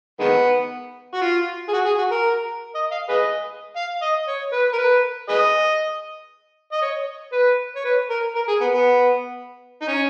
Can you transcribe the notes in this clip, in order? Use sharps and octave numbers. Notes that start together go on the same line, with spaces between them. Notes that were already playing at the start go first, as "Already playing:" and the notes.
D#3 G#3 B3
F#4
F4
G#4
F#4
G#4
F#4
A#4
D#5
F5
G#4 B4 D#5
F5
D#5
C#5
B4
A#4
B4
G#4 B4 D#5
D#5
C#5
B4
C#5
B4
A#4
A#4
G#4
B3
B3
D#4
C#4